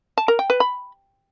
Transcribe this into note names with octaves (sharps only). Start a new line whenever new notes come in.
A5
A#4
G5
B4
B5